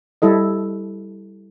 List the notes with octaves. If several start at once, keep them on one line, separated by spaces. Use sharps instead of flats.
G3 E4 A4 D#5